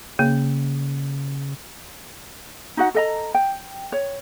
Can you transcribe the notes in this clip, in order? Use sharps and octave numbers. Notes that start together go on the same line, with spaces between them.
C#3 A#3
D#4 F#4 F#5
A4 D#5 A#5
G5
C#5